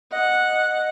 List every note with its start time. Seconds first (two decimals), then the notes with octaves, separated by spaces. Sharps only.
0.12 D#5 F#5